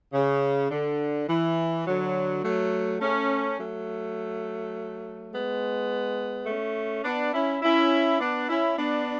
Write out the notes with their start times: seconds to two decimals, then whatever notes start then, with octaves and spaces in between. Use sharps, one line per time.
0.13 C#3
0.70 D3
1.28 E3
1.85 D3 F#3
2.43 F#3 A3
3.00 A3 C#4
3.58 F#3 A3
5.32 G#3 B3
6.46 A3 C#4
7.04 B3 D4
7.33 C#4 E4
7.62 C#4 E4
8.19 B3 D4
8.48 C#4 E4
8.77 B3 D4